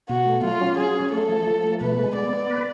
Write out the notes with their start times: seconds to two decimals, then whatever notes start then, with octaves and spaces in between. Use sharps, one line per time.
0.09 B2 F#4
0.26 A3
0.44 F#3 F4
0.61 C#4
0.77 F#3 G#4
0.95 C#4
1.12 A3 A4
1.29 F3
1.47 F3
1.64 A3
1.81 B2 B4
1.99 G#3
2.15 B3 D5
2.33 B3
2.50 B4